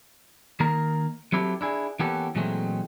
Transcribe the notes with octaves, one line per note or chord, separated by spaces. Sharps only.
D#3 A#3 A#4 A#5
F#3 C4 E4 G4 A4
D4 E4 G#4
E3 A#3 B3 C#4 G4 A4
A#2 E3 F#3 G#3 A3 C4